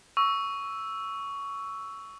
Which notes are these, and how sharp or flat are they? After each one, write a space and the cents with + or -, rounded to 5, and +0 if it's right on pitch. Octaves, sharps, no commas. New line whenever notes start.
C#6 +15 E6 +0